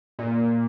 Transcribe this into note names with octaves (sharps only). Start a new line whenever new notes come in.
A#2